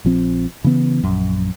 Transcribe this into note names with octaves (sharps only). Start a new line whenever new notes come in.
A#1 F3 C4
C#3 E3 B3
A#1 F#2